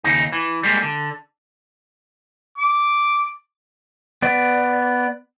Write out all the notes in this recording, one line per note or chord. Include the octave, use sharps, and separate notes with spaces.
D#2 C#3 D#4
E3
G3 G#3 A#3
D3
D6
B3 D5